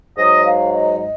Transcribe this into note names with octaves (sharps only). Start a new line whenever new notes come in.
G#2 F#3 D#5
F5
D#5
D#5